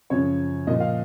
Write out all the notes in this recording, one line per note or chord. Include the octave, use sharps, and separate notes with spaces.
F#2 C#3 F3 C#5
A#2 F3 D#5
F5